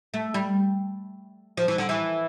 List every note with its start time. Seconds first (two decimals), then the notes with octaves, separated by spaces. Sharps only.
0.14 A3
0.34 G3
1.57 F3
1.68 E3
1.78 D3
1.89 E3